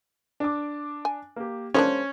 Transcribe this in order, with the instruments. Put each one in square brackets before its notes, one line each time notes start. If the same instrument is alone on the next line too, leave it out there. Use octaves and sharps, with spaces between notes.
[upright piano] D4 D6
[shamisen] G#5
[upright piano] A#3 G4
[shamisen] G#3 A#3 D4 [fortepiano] C#4 [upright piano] C5